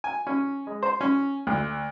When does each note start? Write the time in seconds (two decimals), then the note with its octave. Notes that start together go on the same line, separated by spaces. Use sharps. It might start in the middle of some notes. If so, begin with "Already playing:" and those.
0.04 G#5
0.27 C#4
0.67 G#3
0.83 C5
1.01 C#4
1.47 D2